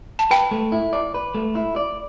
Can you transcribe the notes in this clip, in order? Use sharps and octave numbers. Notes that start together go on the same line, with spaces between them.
A5
B4 G5
A3
E4
D5
B4
A3
E4
D5